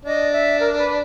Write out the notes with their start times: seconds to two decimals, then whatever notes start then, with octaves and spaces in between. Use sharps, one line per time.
0.05 D4 D#5
0.32 E5
0.60 A#4
0.73 A#4
0.77 B4